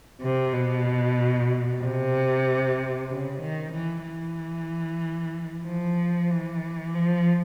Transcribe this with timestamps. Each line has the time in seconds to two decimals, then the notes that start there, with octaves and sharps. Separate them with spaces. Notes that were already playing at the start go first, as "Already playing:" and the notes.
0.21 C3
0.53 B2
1.81 C3
3.10 C#3
3.41 D#3
3.74 E3
4.06 E3
5.65 F3
6.30 E3
6.94 F3